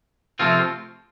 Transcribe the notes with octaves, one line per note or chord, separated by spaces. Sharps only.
C3 F3 A3 C4 F4